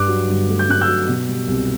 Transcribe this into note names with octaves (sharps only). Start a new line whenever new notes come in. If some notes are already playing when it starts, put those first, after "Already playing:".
Already playing: G2 D6 F#6
F#3
G1
A3
G6
G2 F#6
E6 G6
F#3
B2
G3
C2